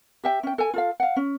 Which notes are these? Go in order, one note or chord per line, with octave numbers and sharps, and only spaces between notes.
G4 E5 G5
C#4 G5
A4 G#5
F4 A4 F5
F5 F#5
C#4